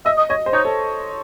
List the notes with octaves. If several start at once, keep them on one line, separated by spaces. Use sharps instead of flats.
D#5 E5
D#5
C#5 D#5
C5
D#4 C#5
A4